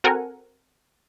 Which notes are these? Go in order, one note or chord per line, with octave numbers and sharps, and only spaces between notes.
C4 F#4 A4 A#4 F#5 G#5